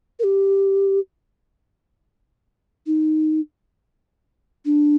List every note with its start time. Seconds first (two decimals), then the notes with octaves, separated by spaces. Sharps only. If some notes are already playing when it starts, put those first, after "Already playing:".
0.19 A#4
0.24 G4
2.87 D#4
4.65 D4